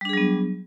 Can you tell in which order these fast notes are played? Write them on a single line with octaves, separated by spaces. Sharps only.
G3 D4 G#4 F#3 B3